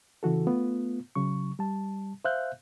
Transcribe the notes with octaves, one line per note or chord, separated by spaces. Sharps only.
C#3 E3 F#4 A4
A3 B3 F4
C#3 F#3 C#6
G3 A5
C5 E5 F5 F#6 G6